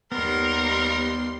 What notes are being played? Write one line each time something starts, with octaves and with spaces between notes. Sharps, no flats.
D#2 G3 B3 A#4 C6